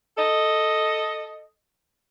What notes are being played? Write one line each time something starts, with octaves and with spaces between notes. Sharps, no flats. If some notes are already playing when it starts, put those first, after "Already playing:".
A4 D#5